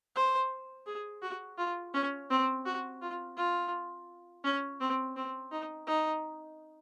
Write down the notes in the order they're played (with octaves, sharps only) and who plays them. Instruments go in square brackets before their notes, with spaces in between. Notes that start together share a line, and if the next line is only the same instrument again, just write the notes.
[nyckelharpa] C5
G#4
F#4
F4
C#4
C4
F#4
F4
F4
C#4
C4
C4
D#4
D#4